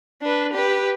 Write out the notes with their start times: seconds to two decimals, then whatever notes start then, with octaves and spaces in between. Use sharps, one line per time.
0.22 D4 B4
0.53 G4 B4